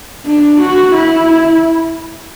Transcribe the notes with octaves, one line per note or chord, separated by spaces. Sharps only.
D4
F#4
E4